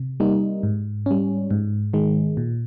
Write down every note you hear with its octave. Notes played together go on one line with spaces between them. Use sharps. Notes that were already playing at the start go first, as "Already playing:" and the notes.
Already playing: C3
G3 A#3 D#4
G#2
G3 C#4
G#2
D#3 G#3
A#2